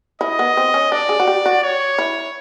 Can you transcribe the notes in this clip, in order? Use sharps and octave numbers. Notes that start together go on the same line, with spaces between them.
E4 D#5
B3
C4
C#4
D4 D5
G#4
F#4
G4
F#4
C#5
E4